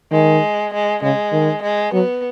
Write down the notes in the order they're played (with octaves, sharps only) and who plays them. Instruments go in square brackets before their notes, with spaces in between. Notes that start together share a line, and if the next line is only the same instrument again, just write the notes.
[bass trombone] D#3 [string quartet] G#3
[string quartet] G#3
[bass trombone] C#3 [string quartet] G#3
[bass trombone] D#3
[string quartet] G#3
[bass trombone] F#3 [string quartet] B3